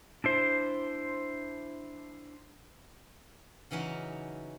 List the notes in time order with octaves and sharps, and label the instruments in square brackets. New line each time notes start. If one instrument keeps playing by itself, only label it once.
[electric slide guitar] D4 E4 C5
[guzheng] C#3 E3 F#3 C#4 D#4